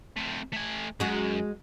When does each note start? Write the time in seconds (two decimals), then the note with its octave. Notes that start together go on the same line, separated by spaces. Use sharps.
0.17 A3 C4
0.52 A3 G#5
1.00 F#2 G#3 F#4